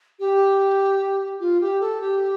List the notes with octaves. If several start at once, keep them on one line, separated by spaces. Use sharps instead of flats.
G4
F4
G4
A4
G4